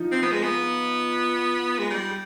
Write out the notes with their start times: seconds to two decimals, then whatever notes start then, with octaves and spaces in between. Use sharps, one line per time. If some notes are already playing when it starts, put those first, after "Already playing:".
Already playing: F3 D#4
0.12 C4
0.22 B3
0.32 G#3
0.43 B3
1.79 G#3
1.90 G3